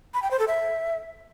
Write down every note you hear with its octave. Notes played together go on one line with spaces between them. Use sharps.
B5
G5
C5
A4
E5